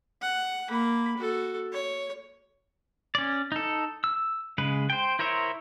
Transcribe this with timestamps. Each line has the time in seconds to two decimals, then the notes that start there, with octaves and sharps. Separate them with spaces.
0.22 F#5
0.69 A#3 B5
1.17 F#4 A4
1.72 C#5
3.15 C#4 D5
3.52 D#4 A4
4.04 E6
4.58 C#3 G#3 B4
4.90 C5 G5
5.19 E4 A#4 C5 C#5 E5